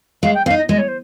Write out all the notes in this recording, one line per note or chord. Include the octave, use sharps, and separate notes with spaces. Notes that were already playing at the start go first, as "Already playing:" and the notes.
G#3 F5
G5
C4 F5
D#4
D#5
G#3 D#5
C#5
C5